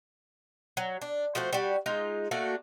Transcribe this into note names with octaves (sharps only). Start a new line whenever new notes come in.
F#3
D4
F3 A3 F#4 C5
G3 F#4
G#3 D#4 F4
A3 A#3 D4 F#4